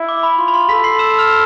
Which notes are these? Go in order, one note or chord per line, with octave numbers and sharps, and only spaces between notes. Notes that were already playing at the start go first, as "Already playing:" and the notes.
Already playing: E4
D6
B5
F4 C6
B5
C6
A4 B5 B6
C6 C7
E6 E7
E7
F6 F7